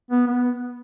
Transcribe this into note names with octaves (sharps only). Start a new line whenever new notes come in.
B3
B3